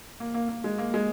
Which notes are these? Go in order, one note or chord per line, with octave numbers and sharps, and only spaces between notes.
A#3
A#3
A#3
G#3
A#3
G#3